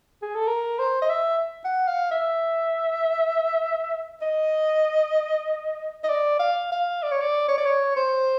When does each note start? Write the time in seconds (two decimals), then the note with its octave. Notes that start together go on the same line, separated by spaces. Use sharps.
0.22 G#4
0.35 A4
0.48 A#4
0.79 C5
1.02 D#5
1.10 E5
1.65 F#5
1.88 F5
2.11 E5
4.22 D#5
6.04 D#5
6.09 D5
6.39 F5
6.72 F5
7.03 D5
7.11 C#5
7.21 D5
7.49 C#5
7.58 D5
7.65 C#5
7.96 C5